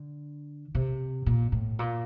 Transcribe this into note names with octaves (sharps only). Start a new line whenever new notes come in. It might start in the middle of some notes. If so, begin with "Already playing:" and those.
Already playing: D3
C3
A#2
A2
A#2